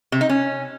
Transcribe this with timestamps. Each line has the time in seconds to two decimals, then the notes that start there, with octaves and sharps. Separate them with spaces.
0.12 C3
0.21 D#4
0.29 C#4